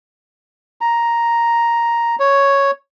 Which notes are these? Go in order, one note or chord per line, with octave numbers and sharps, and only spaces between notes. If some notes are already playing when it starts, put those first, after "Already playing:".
A#5
C#5